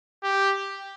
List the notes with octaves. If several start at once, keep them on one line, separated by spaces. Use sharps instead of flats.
G4